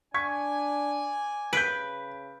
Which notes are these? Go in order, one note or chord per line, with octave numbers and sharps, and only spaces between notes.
D4 D5 G#5 C#6 G#6 B6
C#3 B4 G6 B6 D7